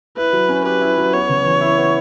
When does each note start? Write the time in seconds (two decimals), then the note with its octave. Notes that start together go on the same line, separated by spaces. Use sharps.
0.17 E4 B4
0.33 F#3
0.49 C#4
0.65 G4 B4
0.81 E4
0.98 F#3
1.13 B3 C#5
1.29 C#3
1.45 E3
1.61 E4
1.78 B3